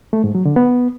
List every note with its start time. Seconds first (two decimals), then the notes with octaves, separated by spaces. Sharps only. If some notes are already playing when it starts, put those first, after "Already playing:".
0.13 A3
0.24 G#2
0.35 F#3
0.45 D3
0.56 B3